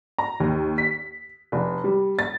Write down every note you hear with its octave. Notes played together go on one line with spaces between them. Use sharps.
A#5
D#2
B6
F1
G3
A6